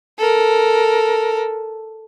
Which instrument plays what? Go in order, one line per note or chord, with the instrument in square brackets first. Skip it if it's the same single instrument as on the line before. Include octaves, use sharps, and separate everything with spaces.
[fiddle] A4 A#4